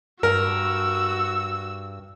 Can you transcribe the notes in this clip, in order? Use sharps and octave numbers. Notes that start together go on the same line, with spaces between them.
G2 F#4 A#4 E6